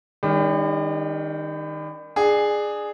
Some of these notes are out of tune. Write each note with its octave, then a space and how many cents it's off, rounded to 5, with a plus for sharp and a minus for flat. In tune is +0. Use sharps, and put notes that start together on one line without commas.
D#3 +0 G3 +40 D4 -40
D4 +25 G#4 +0